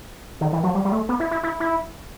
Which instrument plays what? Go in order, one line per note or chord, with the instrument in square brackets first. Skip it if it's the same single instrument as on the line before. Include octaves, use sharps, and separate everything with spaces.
[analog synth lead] D#3
E3
F#3
G3
G3
A3
B3
E4
E4
E4
E4